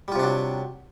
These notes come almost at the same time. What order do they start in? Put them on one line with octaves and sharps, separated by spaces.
G3 F4 C3 D4 F#3